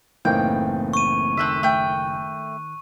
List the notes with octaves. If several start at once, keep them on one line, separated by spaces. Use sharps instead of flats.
F#1 A2 E3 A#3 C4 D#4 G5
C#6 D#7
D#3 C4 A4 E5 F#6
A3 G5